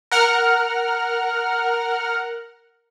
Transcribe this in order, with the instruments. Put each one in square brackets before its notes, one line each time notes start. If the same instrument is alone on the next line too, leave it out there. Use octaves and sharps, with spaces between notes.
[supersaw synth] A#4 F#5 F6